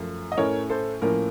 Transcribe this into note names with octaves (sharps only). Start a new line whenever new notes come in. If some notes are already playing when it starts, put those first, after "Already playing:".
Already playing: F#2 F3 A3
D#5
A2 A3 C#4 A#4 C#5
A4 C5
A2 F3 A#3 C#4 A#4